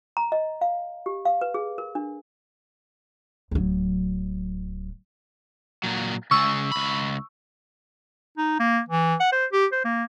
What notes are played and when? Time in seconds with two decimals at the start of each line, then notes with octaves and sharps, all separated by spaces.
0.17 A#5
0.32 D#5
0.61 F5
1.06 G4
1.25 F5
1.41 B4
1.54 G#4
1.78 A#4
1.95 D4
3.51 D1 F#3
5.83 A#2 F#3
6.31 C#3 G#3 C#6 E6
6.72 C#2 B5
8.38 D#4
8.59 A#3
8.89 E3
9.20 F#5
9.32 C5
9.52 G4
9.72 C5
9.85 A#3